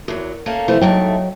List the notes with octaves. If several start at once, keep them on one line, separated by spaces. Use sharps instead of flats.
E2 F#3 A#4
A3 A#3 C#4
C3 E3 F3 A3
D#2 G#2 F#3 A3 D#5 G5